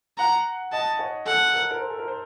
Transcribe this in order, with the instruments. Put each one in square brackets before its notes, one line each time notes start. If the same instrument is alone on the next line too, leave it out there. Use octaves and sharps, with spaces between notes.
[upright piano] F#5 [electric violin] A#5
[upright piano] D#5 [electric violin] A5
[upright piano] C#5
[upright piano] A4 [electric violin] F#5
[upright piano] A#4
A#4
C5
A4
A#4
C5